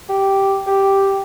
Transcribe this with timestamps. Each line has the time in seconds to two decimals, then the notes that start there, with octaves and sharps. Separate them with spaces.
0.09 G4
0.67 G4